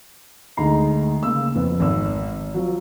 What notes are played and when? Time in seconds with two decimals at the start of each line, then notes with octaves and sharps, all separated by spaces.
0.57 D2 G#3 D#4 A#5 C7
1.23 C#3 A#3 E6
1.55 F2 B3
1.80 G#1 E6
2.54 F3 F#3